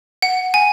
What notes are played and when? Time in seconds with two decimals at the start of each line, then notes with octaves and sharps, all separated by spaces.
0.22 F#5
0.54 G#5